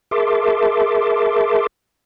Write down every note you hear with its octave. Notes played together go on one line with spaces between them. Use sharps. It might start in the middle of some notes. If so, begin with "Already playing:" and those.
G#4 A#4 E5 A5 C6 D6